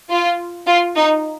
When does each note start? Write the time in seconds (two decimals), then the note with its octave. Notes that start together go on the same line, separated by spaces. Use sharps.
0.10 F4
0.67 F4
0.96 D#4